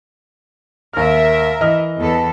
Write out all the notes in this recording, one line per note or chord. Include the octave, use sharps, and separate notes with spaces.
D#2 A#4 E5 F6
E3 D#5 F6
E2 A4